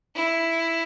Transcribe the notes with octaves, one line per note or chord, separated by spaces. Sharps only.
E4